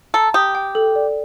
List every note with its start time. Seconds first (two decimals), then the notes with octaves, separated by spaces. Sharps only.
0.14 A4 A#5
0.34 G4 D#6
0.55 G5
0.75 A4
0.95 D5